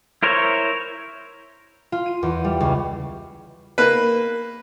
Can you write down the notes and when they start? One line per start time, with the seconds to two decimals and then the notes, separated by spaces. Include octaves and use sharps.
0.23 E4 A#4 C5 C#5
1.92 F4
2.06 D#7
2.23 E2
2.44 G3
2.60 C#2
3.78 A#3 B4